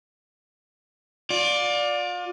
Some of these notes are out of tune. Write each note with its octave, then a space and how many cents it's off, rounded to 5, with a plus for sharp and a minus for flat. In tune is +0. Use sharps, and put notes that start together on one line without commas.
F4 +35 D5 +0